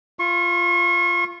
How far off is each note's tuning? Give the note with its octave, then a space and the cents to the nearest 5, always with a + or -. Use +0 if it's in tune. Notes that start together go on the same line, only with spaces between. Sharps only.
F4 -15 C#6 -35